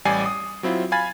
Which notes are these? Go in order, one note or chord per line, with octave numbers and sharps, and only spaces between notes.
A1 G3 G4 D5 G#5 C7
D#6
F#3 C4 E4 F4
F5 G#5 B5 G#6 A6